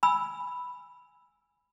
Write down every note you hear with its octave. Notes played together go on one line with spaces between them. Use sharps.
G#5 B5 E6